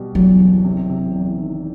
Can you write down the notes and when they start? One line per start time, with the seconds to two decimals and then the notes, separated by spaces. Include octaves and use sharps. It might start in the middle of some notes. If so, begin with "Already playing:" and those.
Already playing: B2 G3
0.15 E2 F#3
0.40 F#1
0.64 C3
0.89 C3
1.13 E2
1.38 D#3